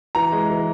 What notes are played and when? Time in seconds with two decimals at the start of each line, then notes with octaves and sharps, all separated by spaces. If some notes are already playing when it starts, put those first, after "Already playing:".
0.15 E3 A#5
0.32 G#3
0.50 E3